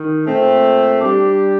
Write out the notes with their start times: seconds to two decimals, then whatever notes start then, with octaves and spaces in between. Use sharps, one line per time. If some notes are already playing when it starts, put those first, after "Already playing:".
Already playing: D#3
0.26 A#2 A3 C4
1.00 G3 D4 G4